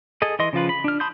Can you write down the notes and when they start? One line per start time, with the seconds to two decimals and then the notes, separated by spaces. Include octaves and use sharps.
0.22 G#4 A4 D#5
0.39 E3 D#5 C6
0.53 C#3 F3 F4 B4
0.69 B5
0.84 D4 F6
1.00 A5 B5 C6 D#6 G6